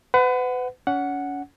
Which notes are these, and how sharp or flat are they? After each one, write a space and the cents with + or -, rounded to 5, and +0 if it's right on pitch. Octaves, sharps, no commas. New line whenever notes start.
B4 +35 F#5 +0
C#4 +30 F#5 +0